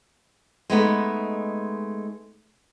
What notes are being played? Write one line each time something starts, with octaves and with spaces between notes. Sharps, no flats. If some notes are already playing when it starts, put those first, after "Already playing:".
G#3 A3 B3 D#4